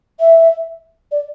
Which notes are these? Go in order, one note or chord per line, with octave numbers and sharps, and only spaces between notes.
E5
D5